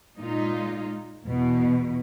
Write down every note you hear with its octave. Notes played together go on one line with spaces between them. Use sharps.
A#2 G#3 D#4 F4
E2 B2